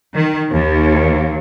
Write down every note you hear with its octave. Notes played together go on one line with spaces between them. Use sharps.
D#3
D#2